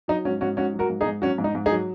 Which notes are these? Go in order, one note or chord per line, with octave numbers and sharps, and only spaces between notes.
F#3 D#4
G#2 C#4 F#4
G#2 C#4 F#4
G#2 C#4 F#4
F#3
F#4 A#4
G#2
D#4 G#4
G#2
F#3 C#4 F#4
G#2
D#4
G#2
D#4 G#4
F#3